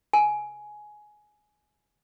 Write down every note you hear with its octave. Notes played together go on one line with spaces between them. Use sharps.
G#5